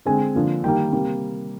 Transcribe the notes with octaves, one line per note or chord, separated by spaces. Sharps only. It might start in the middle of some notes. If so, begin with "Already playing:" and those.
D3 G#3 C4 G#5
D3 F3 A#3
D#3 G3 A#3 G5
C3 G3 A#3